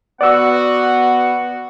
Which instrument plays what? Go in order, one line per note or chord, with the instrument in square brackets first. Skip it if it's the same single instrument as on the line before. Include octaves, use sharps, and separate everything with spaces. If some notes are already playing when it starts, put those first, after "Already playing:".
[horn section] B3 F#4 [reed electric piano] D5 E6 [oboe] F#5